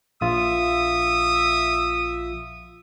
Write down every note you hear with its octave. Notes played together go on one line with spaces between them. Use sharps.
A#1 F4 E5 D#6